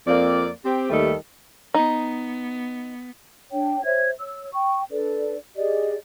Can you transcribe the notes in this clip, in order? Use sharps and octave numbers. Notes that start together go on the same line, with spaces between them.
F2 A#3 C4 D5
C4 G4
D#2 D#3 G3 A3 A4
B3 D#4
D4 C#5 G5
C5 C#5 E5 G#6
C#5 E6
G5 C#6
D4 A4 B4 D5
G4 G#4 D5 D#5